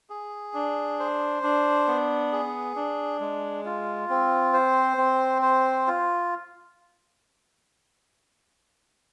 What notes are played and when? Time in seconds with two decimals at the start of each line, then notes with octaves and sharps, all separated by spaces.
0.10 G#4
0.54 D4
0.99 C5
1.43 D4
1.88 B3
2.32 G#4
2.76 D4
3.20 G#3
3.65 F4
4.09 C4
4.53 C5
4.97 C4
5.42 C5
5.87 F4